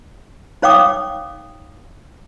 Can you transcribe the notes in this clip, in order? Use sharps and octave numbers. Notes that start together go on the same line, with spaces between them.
D#4 C#5 F5 G5 D6 D#6